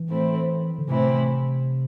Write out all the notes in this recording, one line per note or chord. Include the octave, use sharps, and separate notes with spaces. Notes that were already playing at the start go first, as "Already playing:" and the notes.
Already playing: E3
A2 A3 C4 E4
D3
A2 C3 E3 C4 E4